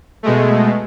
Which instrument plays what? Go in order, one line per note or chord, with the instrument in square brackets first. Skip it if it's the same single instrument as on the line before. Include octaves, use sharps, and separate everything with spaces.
[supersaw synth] B2 G#3 A3